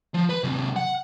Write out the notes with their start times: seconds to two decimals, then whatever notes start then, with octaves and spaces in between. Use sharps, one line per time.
0.14 F3
0.29 B4 B5
0.43 C3 F#3
0.76 F#5